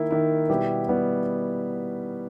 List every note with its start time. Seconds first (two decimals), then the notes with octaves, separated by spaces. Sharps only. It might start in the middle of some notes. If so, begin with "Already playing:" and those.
Already playing: D#3 A#3 E4
0.11 D#3 A#3 E4
0.49 B2 G3 B3 E4 G4
0.88 B2 G3 B3 E4 G4